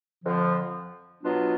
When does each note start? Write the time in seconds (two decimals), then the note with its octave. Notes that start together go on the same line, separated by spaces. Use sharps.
0.25 F2 D3 F3
1.23 B2 F#3 B3 D4 F4